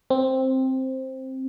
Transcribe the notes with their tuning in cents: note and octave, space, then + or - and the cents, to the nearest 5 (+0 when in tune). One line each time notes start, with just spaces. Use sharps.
C4 +5